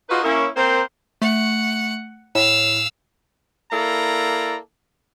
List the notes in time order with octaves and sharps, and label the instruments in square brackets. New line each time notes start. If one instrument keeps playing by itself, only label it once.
[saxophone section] D#4 F4 F#4 G#4 B4 D#5
A#3 C#4 E4
A#3 C4 A#4 C5
[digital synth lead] A3 [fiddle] F#5
[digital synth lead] A2 [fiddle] F5 E6
[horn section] A#3 E4 A4 D5 A#5